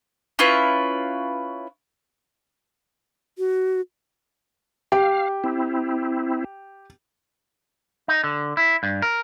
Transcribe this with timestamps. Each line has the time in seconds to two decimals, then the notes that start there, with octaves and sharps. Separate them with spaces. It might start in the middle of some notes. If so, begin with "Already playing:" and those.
0.39 C#4 E4 F4 B4
3.38 F#4
4.92 G4 F5
5.44 C4 E4
8.08 D#4
8.24 D3
8.57 E4
8.83 G2
9.02 A#4